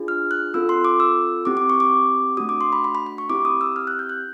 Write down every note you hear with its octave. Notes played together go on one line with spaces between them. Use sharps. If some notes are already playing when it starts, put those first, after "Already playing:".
Already playing: D4 F4 G#4
F6
F#6
C4 F4 A4 E6
C6
D6
E6
C4 E4 G4 D6
D6
C#6
D6
A3 D4 F#4 D#6
D6
C6
B5
B5
B5
B5
C#6
C4 E4 G4 D6
D#6
E6
F6
F#6
G6
F#6